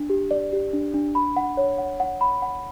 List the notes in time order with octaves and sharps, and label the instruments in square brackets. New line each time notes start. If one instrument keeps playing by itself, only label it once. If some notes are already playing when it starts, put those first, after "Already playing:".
Already playing: [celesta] D4
G4
D5
G4
D4
D4
B5
F#5
C#5
F#5
F#5
B5
F#5